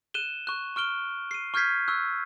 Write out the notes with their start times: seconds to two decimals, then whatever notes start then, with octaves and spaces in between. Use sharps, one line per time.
0.14 F#6 D#7 E7 G7
0.47 C#6 F#6
0.76 C#6 F6 D7 G7
1.31 C7 D#7
1.54 C#6 F6 G6 G#6 B6 C7
1.88 C#6 E6 F#6